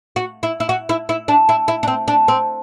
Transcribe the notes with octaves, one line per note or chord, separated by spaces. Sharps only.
F#4
E4
E4
F#4
E4
E4
D4
E4
E4
D4
C4
D4
C4